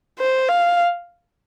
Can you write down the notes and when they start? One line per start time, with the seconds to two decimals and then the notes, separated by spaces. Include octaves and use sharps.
0.19 C5
0.49 F5